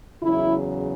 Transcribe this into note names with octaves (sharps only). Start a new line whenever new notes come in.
E2 C#3 F#3 E4